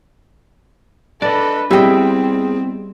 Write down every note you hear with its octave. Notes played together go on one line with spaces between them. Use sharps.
D4 A4 B4 D5 D#5
G3 B3 C4 E4 G#4 D#5 G5